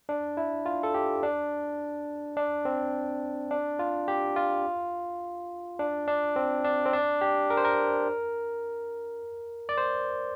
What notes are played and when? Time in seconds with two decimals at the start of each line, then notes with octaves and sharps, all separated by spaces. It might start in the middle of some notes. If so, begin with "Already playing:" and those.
0.09 D4
0.37 E4
0.66 F4
0.83 A4
0.94 G4
1.23 D4
2.37 D4
2.65 C4
3.51 D4
3.79 F4
4.08 G4
4.36 F4
5.79 D4
6.07 D4
6.36 C4
6.65 D4
6.86 C4
6.93 D4
7.21 G4
7.50 A#4
7.57 C5
7.65 A#4
9.69 D5
9.77 C5